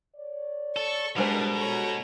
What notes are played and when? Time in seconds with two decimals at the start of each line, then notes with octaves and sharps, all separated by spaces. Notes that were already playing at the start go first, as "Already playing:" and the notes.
0.16 C#5 D5
0.76 A4 C#6
1.17 E2 B2 G3 G#3 D4 A#4 C5
1.56 F#4 A4 C#5 A#5